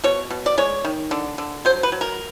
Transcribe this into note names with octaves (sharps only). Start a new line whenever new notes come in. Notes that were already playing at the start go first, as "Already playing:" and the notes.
B2 C#5
B2
D5
G#3 C#5
D#3
D3
D3
F#3 C5
B4
F#3
A#4